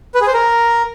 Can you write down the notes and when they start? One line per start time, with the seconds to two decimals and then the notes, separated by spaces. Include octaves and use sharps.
0.15 B4
0.21 G#4
0.27 C5
0.34 A#4